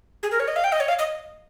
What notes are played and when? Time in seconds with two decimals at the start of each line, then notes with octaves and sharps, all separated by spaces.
0.23 G#4
0.31 A#4
0.40 C#5
0.48 D#5
0.56 F5
0.64 G5
0.72 D#5
0.80 C#5
0.88 F5
0.99 D#5